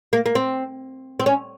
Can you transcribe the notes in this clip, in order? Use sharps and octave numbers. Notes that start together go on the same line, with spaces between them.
A#3
A#3
C4
C4
C#4